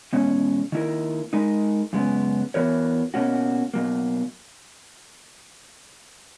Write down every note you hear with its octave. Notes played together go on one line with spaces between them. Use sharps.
E2 B2 G#3 C#4
D#3 A#3 E4 A#4
G#3 D#4 A#4
F#2 C#3 G#3 B3
E3 B3 F#4 A#4 C#5
B2 A#3 C#4 F#4
B2 F#3 A#3